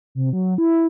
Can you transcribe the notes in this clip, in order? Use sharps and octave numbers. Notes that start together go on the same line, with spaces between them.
C3
F#3
E4